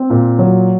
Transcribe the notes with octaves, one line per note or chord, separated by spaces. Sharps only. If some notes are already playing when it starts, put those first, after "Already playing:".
Already playing: C4
A#2
F#3